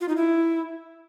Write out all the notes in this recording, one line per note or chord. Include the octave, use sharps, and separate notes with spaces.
F4
D#4
E4